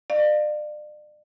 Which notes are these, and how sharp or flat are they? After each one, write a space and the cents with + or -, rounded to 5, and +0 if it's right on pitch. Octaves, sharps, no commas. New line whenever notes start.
D5 +35 F5 +0